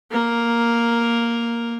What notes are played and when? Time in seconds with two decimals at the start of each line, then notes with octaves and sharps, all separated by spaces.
0.11 A#3 A#4